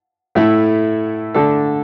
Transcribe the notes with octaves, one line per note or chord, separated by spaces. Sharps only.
A2 A3 E4
D3 A3 D4 A4